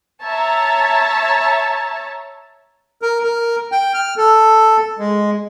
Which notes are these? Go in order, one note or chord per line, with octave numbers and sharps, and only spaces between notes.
C#5 E5 A5 A#5
A#4
A#4
G5
F6
A4
G#3